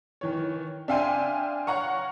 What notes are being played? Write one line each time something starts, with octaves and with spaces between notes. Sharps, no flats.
D#3 E3 C#5
D4 E5 F5 G5 G#5 C6
C#5 F5 F#5 A#5 C#6